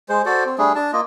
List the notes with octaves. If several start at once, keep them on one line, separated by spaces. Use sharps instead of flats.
G#3 C5
F#4 A4 C5 D5
C4
G3 A3 D4 G#4
D4 A5
A#3 F4 D#5